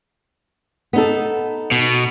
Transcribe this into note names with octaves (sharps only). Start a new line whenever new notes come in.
B3 D#4 A4
B2